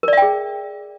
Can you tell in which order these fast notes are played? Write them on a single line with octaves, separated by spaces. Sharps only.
A#4 D5 E5 G5 G#4